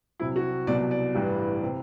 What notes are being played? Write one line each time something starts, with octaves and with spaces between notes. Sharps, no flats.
C2 C3 F#3 E4
F#4
C2 B2 F#3 D5
D5
A1 G2 E3 G3
C3